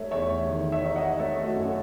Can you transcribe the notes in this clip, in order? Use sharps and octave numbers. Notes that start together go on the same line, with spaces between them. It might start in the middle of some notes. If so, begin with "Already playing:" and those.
Already playing: A3 D#4 C#5 E5
E2 C#5 E5
D#3
C#5 E5
D#4
D#5 F#5
A3 C#5 E5
F#4 A4
F#2
A4